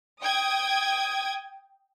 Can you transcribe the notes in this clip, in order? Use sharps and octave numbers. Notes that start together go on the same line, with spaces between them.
G5 D#6 G#6